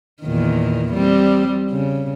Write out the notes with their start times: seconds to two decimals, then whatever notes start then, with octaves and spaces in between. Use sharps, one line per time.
0.23 E2 A#2 D#3
0.94 G3 C4
1.71 C#3